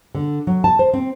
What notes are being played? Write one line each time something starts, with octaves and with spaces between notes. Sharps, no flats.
D3
F#3
A5
C5
C4